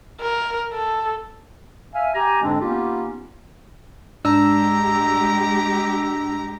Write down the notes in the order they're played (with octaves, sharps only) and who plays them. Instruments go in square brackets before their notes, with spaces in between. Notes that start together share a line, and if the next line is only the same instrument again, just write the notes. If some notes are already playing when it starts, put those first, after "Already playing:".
[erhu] A#4
A4
[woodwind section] E5 F5 G#5
G4 G#5 A#5
F2 G#2 D3 G#3 C4 D4
A#3 B3 C#4 D#4 F4 G4
[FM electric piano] G#2 D4 E6 [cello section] G#3 G4 [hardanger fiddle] A#5